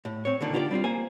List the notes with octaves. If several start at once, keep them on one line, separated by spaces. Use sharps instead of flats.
A2
C4 C#5
D2 A#2 D3 D#3
D4 F4 G4 C5 D5
G3 C4 D#4 F4
A#3 C5 G#5